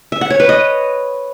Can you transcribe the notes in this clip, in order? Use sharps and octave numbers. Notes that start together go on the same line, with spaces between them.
E5
F#5
C#5
B4
D#5